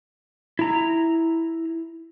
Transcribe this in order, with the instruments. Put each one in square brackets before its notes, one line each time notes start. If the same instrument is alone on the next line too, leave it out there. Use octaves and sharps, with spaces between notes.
[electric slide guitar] E4 A#5